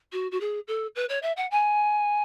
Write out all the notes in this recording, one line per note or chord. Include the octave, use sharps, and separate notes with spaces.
F#4
F#4
G#4
A4
B4
C#5
E5
F#5
G#5